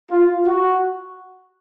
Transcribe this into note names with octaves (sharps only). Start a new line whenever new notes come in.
F4
F#4